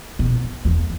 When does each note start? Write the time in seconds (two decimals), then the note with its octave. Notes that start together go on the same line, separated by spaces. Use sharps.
0.19 B2
0.65 E2